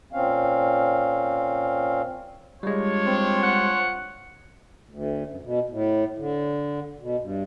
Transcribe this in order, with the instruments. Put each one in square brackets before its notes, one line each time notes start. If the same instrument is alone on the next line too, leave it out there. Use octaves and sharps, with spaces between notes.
[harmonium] A#2 C4 C#4 F5
[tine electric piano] G3 G#3 [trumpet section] D4 F4 C#5
[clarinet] C4 [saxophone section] C5
[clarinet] F#5
[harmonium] D2
F#2
B2
A2
D3
B2
G2